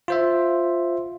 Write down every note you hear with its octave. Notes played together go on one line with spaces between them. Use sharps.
F4 C5 E5